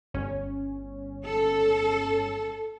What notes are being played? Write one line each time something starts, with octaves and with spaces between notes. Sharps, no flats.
G1 C#4
A4